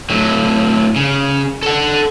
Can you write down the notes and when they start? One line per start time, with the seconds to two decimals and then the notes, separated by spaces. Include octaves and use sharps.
0.10 A2 F#3
0.96 C#3
1.63 A4 F#5